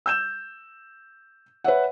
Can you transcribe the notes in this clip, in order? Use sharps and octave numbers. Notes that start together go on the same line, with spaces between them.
E6 G6 E7
B4 C#5 E5 F#5